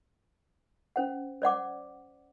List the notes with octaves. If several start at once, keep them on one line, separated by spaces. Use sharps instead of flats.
C#4 C5 F#5
C5 D5 F#5 D6